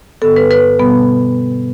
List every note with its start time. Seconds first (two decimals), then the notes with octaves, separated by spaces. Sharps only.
0.22 G2 D3 B3 A4
0.36 B4
0.51 B4
0.79 B2 G3 B3